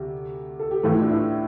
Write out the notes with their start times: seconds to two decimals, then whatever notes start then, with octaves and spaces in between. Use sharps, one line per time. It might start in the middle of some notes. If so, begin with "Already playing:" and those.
Already playing: D2 C3 G4
0.59 A4
0.71 G4
0.83 A2 E3 A3 F4
0.93 E4
1.01 D4
1.11 E4